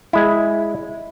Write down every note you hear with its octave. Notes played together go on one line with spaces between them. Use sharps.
G#3 E4